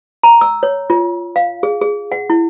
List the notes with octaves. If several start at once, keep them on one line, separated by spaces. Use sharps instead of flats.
A#5
E6
C#5
F4
F5
G#4
G#4
F#5
E4